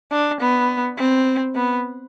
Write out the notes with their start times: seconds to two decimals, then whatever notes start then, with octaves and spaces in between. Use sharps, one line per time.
0.11 D4
0.40 B3
0.98 C4
1.55 B3